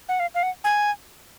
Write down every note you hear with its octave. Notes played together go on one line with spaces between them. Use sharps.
F#5
F5
F5
F#5
G#5